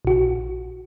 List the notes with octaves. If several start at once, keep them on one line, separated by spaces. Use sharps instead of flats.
A#1 F#4